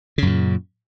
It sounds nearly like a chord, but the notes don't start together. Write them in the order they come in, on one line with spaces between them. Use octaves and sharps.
C#3 F#2 A#2